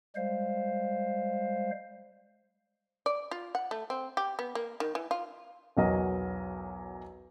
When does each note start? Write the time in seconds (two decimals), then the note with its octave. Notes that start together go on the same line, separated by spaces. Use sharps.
0.16 G3 G#3 C5 F5
3.06 D5
3.31 F4
3.55 F#5
3.71 A3
3.90 C4
4.17 G4
4.39 B3
4.55 A#3
4.80 D#3
4.95 E3
5.11 F4
5.77 B1 E2 F#3 A#4 D#5